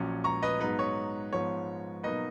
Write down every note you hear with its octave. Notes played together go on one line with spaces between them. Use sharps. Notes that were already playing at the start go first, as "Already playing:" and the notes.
Already playing: A#1 A#2 F#3 C#4
A#5 C#6
B4 D#5
G#2 F#3 B3 D#4 B4
C#5
G#2 F3 B3 C#5
B2 F#3 A#3 D#4 B4 D#5